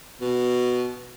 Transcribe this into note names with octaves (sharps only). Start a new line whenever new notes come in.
B2